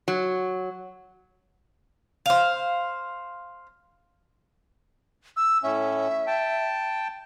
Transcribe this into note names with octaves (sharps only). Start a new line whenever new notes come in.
F#3
C5 F5
E6
A2 C#4 E5
G5 A5